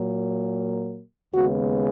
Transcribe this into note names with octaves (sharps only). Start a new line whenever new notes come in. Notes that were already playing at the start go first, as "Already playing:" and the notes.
Already playing: A#2 F#3 A#3
D#2 C#3 G#3 B3 F#4